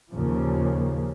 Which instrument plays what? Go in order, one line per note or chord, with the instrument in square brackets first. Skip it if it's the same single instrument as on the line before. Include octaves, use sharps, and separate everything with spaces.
[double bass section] D#2 A#2 C#3 F3